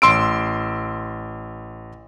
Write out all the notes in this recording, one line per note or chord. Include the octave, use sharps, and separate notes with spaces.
A1 C6 E6 D7